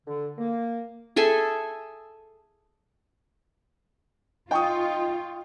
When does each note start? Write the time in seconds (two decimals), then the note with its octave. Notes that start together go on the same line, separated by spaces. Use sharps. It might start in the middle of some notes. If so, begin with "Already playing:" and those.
0.07 D3
0.38 A#3
1.16 G#4 A4 E5 G#5
4.51 D#4 F4 G5 C#6 D#6